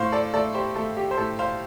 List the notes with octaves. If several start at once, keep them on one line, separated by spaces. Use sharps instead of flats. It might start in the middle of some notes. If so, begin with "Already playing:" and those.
Already playing: A2 C5 F5
A4 D5
A3 A4 D5
G4 C5
A3 A4
G4
C5
A2 A4
C5 F5